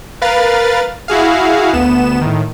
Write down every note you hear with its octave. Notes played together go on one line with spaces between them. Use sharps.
A#4 B4 F5 A6
E4 F#4 G#4 F5
D2 B3 E7
A2 D#3